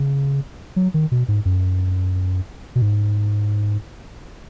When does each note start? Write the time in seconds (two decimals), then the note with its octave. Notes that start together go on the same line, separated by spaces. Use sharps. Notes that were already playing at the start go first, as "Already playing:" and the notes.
Already playing: C#3
0.76 F#3
0.94 D#3
1.12 B2
1.28 G#2
1.45 F#2
2.76 B2
2.82 G#2